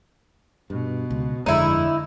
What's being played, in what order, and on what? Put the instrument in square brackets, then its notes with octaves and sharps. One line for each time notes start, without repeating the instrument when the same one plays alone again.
[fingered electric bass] G2 [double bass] B2
[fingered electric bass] C#2
[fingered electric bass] G1 F2 G#3 [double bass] D3 [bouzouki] D#4 E4